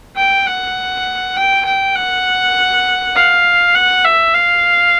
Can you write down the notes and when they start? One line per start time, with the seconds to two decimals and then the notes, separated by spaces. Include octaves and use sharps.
0.16 G5
0.46 F#5
1.36 G5
1.66 G5
1.95 F#5
3.15 F5
3.75 F#5
4.05 E5
4.34 F5